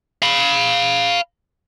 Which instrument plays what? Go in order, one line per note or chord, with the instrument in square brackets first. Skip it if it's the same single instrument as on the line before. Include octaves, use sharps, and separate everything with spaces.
[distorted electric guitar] F5 B5